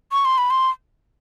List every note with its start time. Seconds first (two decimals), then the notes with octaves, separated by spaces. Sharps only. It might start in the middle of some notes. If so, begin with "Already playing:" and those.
0.12 C#6
0.25 C6
0.38 B5
0.50 C6